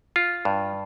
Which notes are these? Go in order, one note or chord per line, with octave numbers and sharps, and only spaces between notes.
F4
G2